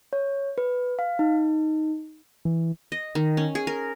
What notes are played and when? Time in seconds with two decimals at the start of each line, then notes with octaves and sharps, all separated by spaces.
0.13 C#5
0.58 B4
0.99 F5
1.19 D#4
2.45 E3
2.92 D#5
3.15 D#3
3.37 C#4
3.55 G#4
3.67 A#4